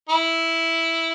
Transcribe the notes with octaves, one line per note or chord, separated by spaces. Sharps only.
E4